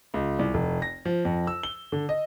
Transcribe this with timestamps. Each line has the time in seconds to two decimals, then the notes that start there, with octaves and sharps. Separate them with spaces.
0.14 C#2
0.39 C2
0.54 F1
0.82 A#6
1.05 F3
1.25 F2
1.47 E6
1.63 G7
1.92 D3
2.09 D#5